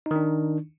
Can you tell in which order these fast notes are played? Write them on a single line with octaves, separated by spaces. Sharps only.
D#4 D#3 D4